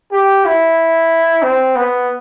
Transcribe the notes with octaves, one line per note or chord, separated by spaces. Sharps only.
G4
E4
C4
B3